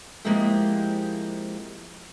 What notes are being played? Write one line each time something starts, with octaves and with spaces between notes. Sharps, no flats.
F3 G#3 A#3 C4 E4 G4